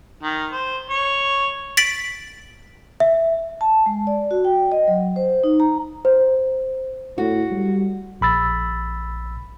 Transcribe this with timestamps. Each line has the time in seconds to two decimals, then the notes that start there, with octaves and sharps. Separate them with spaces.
0.23 D#3
0.51 C5
0.90 C#5
1.77 A6 B6 D7 F#7
3.00 E5
3.61 A5
3.86 G#3
4.07 D5
4.31 F#4
4.45 G5
4.72 D#5
4.88 F#3
5.16 C5
5.44 D#4
5.60 A#5
6.05 C5
7.18 A2 F#4
7.51 G3
8.21 A#1 B5 E6 A6